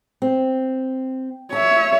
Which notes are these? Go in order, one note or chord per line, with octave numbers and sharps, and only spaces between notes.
C4
C#5 E5 A5